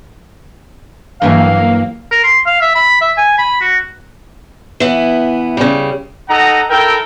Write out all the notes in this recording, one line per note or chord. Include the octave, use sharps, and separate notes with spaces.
G2 E3 F#3 A#3 F5
A#4
C6
F5
E5
B5
E5
G#5
B5
F#4
E3 B3
C#3 G3
D#4 A4 D#5 F#5 A#5
E4 A4 A#4 G5